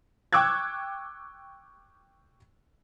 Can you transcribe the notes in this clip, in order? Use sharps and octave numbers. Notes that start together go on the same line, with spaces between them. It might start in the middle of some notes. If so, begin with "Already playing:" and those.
G5 C#6 D6 E6 F#6 G#6